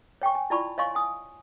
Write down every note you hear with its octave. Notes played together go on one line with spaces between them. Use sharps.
C#5 G5 G#5 C#6
G#5
E4 F4 D5 A5 B5 C#6
C#5 D#5 F5 G#5 C6 C#6
G#5 D#6